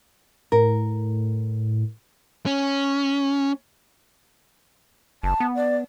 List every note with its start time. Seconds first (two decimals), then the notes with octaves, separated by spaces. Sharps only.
0.52 A2 A#4
2.46 C#4
5.23 F#1 A5
5.40 B3
5.56 D5